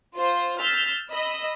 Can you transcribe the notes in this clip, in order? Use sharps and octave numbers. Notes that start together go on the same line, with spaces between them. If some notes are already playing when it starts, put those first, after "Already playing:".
F4 C5
E6 F6 G6 A6 B6 C7
D#5 B5 E6